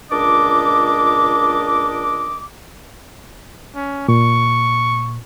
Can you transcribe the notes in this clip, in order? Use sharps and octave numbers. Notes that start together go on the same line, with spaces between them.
C#2 A#2 D4 D#5 D6
C#4
A#2 C#6